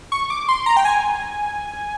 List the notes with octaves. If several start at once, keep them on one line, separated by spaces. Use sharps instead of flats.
C#6
D6
C6
A#5
G5
G#5